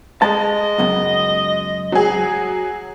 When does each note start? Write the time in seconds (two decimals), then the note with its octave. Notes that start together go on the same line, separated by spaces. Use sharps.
0.22 G#3 D#5 A5
0.78 C#2 F#2 B3
1.92 F#3 G#4